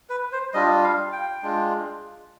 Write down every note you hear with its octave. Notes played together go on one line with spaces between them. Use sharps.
B4
C5
G3 D4 F4 D#5
F5
G5
G#3 D4 F4